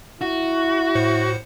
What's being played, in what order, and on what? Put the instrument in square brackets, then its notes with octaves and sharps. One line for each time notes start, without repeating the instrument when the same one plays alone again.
[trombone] E4 [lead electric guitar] F#4
[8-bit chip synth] A2 C5 C#7